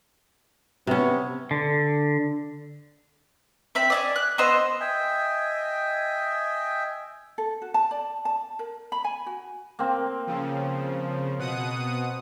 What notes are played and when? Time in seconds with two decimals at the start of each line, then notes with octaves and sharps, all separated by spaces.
0.87 C3 B3 C#4
1.51 D3
3.75 C4 E5 B5
3.90 D5 D#5 G#5
4.16 F#6
4.38 B3 C5 D#5 E6
4.80 D#5 E5 G5 G#5
7.38 A4
7.62 F#4
7.74 A5
7.91 D5
8.25 A5
8.59 A#4
8.92 B5
9.04 G#5
9.26 F#4
9.79 A#3 C4
10.27 C#3 F3
11.39 B2 F#5 D#6